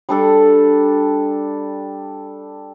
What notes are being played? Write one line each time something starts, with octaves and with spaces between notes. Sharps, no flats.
G3 D4 A4